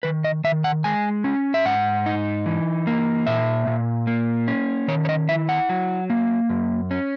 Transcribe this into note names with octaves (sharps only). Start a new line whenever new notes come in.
D#3 B4
D#5
D#3 E5
F#5
G#3 G#5
C#4
E5
G#2 F#5
D#4
E3
A#3
A#2 E5
A#2
A#3
C#4
D#3 C#5
C#5
D#5
E4 E5
F#5
F#3
A#3
F#2
C#4